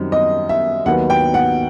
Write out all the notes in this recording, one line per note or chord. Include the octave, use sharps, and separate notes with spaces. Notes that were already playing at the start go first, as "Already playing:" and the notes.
Already playing: F#2 D#3 G3 C4
D#5
E5
D#2 D#3 F#3 B3 F#5
G5
F#5